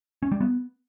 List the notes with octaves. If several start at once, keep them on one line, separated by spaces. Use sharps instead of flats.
C#4
G3
B3